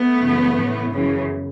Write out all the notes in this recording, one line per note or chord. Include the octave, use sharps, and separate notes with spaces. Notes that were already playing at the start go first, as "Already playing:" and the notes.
Already playing: A3 B3
F#2 C#3 E3
A2 E3
F#2 C#3 E3